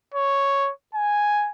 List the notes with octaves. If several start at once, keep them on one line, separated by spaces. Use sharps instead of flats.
C#5
G#5